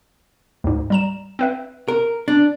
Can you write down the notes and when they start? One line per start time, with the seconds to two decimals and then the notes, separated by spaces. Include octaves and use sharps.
0.64 D2 G#2
0.90 G3 A#5 E7
1.39 C4 B4 E5
1.88 A#4
2.28 D4